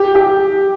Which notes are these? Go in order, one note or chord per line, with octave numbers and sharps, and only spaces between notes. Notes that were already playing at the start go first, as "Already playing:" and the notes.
Already playing: G4
G4